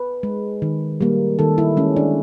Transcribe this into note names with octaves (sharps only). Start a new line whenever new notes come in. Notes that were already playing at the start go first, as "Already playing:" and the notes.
Already playing: B4
G#3
D#3
G3 A#3
D#3 A4
E4
G#3 C#4
D4